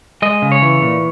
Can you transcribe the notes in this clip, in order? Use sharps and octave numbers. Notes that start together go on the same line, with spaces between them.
G#3 D#5
C#3
C#5
E3
A#2